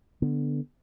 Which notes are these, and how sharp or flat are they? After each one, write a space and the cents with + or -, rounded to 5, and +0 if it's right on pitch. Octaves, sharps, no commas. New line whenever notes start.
D3 +0 B3 -5